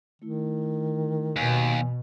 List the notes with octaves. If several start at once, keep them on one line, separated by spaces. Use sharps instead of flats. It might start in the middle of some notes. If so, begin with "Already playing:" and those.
D#3 A3 E4
D#2 B2 G#5